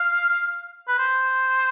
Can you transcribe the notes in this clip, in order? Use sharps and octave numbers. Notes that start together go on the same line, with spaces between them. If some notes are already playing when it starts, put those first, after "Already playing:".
Already playing: F5
B4
C5